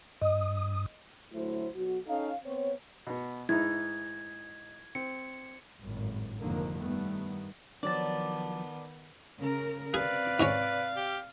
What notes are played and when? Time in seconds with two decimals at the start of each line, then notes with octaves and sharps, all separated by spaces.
0.22 G2 D#5 D#6
1.32 D2 F#3 A3 E4 C5
1.75 B1 F#4
2.07 C#4 D#4 A4 F5
2.44 B3 C4 C#5
3.07 B2 B3
3.49 G#2 D#4 E4 G#6
4.95 C4 C#7
5.81 G#1 F#2 A2
6.40 F1 G#2 D3 D#3 F3 A#3
6.80 G2 D#3 G3 A3 B3
7.83 D#3 F3 F#3 B3 D4 D5 A5
9.39 C#3 A#4
9.94 C3 G#4 B4 D5 F5
10.40 G#2 G#3 C#4
10.96 G4